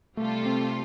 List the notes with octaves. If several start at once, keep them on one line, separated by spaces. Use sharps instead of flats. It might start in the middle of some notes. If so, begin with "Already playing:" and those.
C3 G3 A3 F4 A4
C4